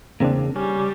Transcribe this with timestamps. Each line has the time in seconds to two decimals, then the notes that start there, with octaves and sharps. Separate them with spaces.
0.20 E2 C#3 A#3 C4 D4
0.56 G3 C#4